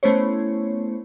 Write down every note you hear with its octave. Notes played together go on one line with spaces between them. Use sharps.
A3 B3 C#4 E4 C5 C#5